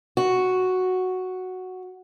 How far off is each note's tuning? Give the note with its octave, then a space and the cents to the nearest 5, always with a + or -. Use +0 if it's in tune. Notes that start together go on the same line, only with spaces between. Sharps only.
F#4 +0